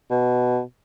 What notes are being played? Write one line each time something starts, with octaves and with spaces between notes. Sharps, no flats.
B2